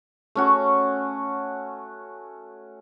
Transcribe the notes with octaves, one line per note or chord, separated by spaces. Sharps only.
A3 C#4 F#4